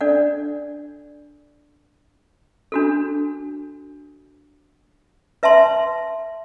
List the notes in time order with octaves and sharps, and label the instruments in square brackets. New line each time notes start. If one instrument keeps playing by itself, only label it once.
[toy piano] D4 A4 D5 F#5
D4 F#4 A4
B4 E5 A5 C6